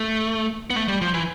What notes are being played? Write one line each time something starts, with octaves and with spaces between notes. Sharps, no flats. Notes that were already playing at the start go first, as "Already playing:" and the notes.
Already playing: A3
B3
A3
G3
F3
E3